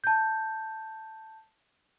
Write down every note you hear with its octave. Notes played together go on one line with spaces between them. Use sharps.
A5 G6